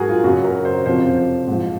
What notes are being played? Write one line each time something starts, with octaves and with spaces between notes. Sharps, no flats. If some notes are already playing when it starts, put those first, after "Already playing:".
Already playing: G#2 F#3 F#4 G#4 A#4
F4
F#2 C#3 F#3 F#4
A#4
C5
F2 C3 F3 C5
G#2 F3